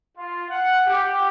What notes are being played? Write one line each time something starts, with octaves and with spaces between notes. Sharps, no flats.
F4
F#5
G4